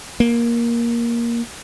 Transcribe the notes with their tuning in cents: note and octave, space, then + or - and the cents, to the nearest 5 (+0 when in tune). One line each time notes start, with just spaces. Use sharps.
A#3 +10